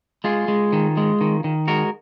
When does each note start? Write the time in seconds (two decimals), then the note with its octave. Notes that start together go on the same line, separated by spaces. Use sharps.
0.24 G#3 F4 G#4
0.48 G#3
0.73 D#3
0.97 G#3
1.21 D#3
1.44 D#3
1.68 G#3 F#4 A#4